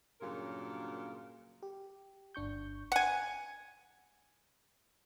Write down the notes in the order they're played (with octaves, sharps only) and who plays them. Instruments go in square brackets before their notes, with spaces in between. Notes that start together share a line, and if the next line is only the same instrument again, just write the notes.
[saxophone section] G2 A#2 C#3 F#3 A#4 F5
[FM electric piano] G4
G1 D4 C#6 G6
[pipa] F#5 G#5